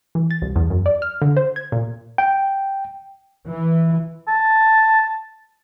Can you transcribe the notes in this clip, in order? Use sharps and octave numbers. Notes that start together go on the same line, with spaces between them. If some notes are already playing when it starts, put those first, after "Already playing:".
E3
A6
C2
E2
F#2
D5
F6
D3
C5
G#6
A#2
G5
E3
A5